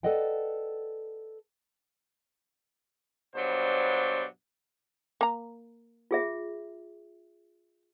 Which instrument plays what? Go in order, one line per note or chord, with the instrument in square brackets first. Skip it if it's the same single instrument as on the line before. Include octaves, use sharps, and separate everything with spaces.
[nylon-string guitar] A4 B4 D5 D#5 F#5 G5
[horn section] G2 B2 F#3 C5 D5
[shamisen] A#3 A#5
[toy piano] F4 G#4 E5